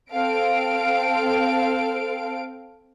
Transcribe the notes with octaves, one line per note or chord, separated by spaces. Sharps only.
C4 A4 F5 D7